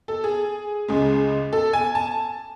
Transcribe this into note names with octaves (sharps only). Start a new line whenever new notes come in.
A4
G#4
C#2 C#3 G#3
A4
G#5
A5